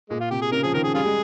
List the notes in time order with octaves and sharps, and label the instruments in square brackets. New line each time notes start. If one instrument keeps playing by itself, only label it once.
[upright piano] A#2 [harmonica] G#3
[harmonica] F4
[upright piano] C3 [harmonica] G4
[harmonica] G#4
[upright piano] C#3 [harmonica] A#4
[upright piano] F3 [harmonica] G#4
[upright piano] D#3 [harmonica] A#4
[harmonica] G#4
[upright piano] G3 [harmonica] F4 G#4
[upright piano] G#3